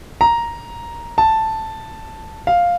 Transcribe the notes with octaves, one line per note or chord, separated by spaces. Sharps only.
A#5
A5
F5